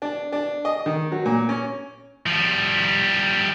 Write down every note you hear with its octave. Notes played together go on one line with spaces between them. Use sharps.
D4
D4
D#5
D#3
F#3
A#2
C#4
F3 G3